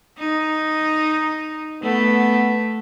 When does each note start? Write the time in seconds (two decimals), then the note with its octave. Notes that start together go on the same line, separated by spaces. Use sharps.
0.19 D#4
1.83 A3 B3